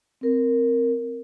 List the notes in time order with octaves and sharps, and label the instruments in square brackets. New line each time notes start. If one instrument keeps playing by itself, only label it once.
[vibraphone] C4 A#4